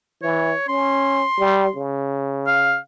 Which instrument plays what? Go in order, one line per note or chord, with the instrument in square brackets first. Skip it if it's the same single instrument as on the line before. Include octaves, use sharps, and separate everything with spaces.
[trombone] E3 [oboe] C#5
[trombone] C#4 [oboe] C6
[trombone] G3
C#3
[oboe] F5